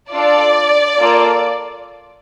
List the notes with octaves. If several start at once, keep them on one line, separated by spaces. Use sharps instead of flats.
D4 F4 A4 D5
A#3 F4 A4